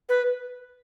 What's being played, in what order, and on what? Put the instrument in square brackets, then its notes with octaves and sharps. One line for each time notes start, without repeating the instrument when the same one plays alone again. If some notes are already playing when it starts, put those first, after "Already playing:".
[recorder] B4